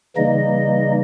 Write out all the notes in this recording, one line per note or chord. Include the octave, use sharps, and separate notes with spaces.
C#3 E3 G3 A#3 D#4 D#5